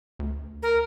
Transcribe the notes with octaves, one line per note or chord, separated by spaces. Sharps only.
D2
A#4